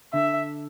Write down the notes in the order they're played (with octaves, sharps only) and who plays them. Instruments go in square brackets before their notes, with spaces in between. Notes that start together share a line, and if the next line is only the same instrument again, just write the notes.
[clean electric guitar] D3 [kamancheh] E5